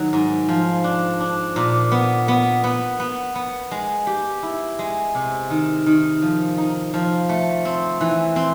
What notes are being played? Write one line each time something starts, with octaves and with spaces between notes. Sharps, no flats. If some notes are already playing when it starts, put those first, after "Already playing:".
Already playing: D#3 F#3
G#2
F3
D4
D4
A#2
B3
B3
B3
B3
B3
G#3
G4
E4
G#3
C3
D#3
D#3
F3
D#4
F3
A3
C4
E3
C4